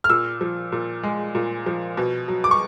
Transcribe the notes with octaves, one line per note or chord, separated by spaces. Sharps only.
F6
A#2 E6
F3
A#2
G#3
A#2
F3
B2
F#3
D6
C#6